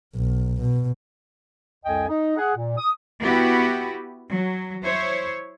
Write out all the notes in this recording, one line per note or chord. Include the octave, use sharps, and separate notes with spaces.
B1
B2
C2 F2 D#5 G5 G#5
D#4
G#4 F#5
A#2
D#6
B3 E4 F#4 G4 B4
F#3
E4 C5 C#5